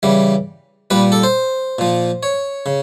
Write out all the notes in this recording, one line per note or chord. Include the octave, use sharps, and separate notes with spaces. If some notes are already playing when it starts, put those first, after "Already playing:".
C#3 E3 G3
A#2 G3 B4
A4
C5
A#2 F3
C#5
C#3